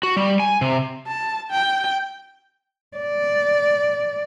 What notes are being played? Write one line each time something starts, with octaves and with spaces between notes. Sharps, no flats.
F#4
G3
G#5
C3
A5
G5
D5